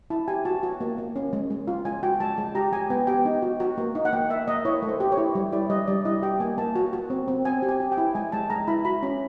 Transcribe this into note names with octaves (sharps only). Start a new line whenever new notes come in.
E4 A5
G4 G#5
F#4 A5
F#4
A#3
A#3
C#4
G#3
G#3
F4
G#3 G#5
F#4 G5
G#3 A5
G#3
G4 A#5
G#3 G#5
B3 G5
G4 G5
D#4
F#4
F#4
A#3
D#4
F#5
A#3 G5
A#3 E5
A#3 D#5
E4 C#5
A3
C5
G4
C#5
E4
G3
E4 D5
G3 D#5
G3 D5
E4 D#5
G4 G5
A#3 G#5
A#3 A5
F#4
F#4
C4
C4
C4 G#5
G4
G#5
G4
G5
E4
G#3 G#5
G#3 A5
G#3 A#5
E4 B5
F#4 B5
C#4